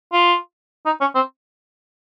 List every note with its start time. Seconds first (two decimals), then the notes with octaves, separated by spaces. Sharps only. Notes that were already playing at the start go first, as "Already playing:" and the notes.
0.13 F4
0.86 D#4
1.01 C#4
1.15 C4